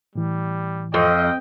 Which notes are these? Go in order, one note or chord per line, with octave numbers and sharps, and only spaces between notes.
A2 E3 G3
F2 D#5 G5